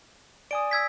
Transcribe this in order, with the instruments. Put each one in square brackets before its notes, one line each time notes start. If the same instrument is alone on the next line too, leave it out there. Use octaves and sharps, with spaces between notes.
[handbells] D5 G#5 D#6 [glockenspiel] D7
[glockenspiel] E6 G#6 B6